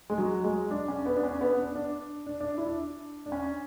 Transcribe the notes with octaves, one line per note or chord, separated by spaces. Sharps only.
G#3
F#3
G#3
D4
C#4
B3
D4
C#4
B3
D4
D4
D4
D4
E4
D4
D4
C#4